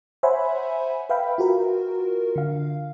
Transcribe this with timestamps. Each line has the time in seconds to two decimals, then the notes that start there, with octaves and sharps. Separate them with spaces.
0.23 C5 C#5 E5 F#5 G#5 B5
1.09 B4 E5 F5 G5 B5
1.38 F4 F#4 A#4
2.36 D3 F5